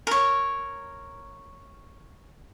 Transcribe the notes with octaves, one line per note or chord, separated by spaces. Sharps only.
A#4 C#5